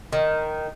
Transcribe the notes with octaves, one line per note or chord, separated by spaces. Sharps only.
D#3